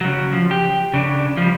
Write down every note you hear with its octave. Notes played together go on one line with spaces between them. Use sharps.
C#3 F#3
F3
G4
C#3 D4
F3 G3